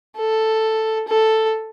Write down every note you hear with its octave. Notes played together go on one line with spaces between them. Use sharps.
A4
A4